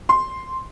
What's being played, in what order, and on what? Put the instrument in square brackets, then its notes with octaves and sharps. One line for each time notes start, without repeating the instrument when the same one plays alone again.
[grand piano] C6